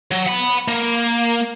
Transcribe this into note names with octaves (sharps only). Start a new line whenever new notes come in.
F#3
F#5 B5
A#3